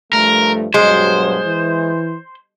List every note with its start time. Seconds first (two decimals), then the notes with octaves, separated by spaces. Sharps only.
0.13 G2 F3 A3 A#4
0.74 G2 B2 F#3 G#3 C5
1.46 E3